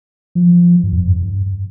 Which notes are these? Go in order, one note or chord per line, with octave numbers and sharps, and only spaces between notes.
F3
G2
F2
G2
G2